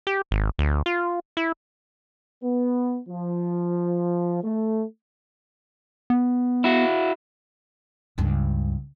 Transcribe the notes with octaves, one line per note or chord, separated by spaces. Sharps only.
G4
G#1
D2
F4
E4
B3
F3
A3
B3
E4 F#4
C#2 G2